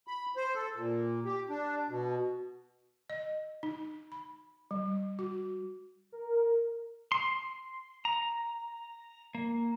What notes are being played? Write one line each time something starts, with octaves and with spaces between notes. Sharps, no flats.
B5
C5
A4
A#2
G4
D4
B2
D#5
D#4
B5
G3
F#4
A#4
C6
A#5
A#3